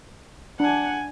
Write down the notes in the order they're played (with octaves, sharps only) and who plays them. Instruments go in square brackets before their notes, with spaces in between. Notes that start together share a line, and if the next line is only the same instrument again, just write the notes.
[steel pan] D4 [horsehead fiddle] F#5 G#5